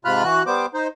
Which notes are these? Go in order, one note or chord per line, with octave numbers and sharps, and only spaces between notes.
G#2 C3 F4 B5 F6 F#6
E3 F#4 F#6
G3 B3 C5 D6
D#4 C5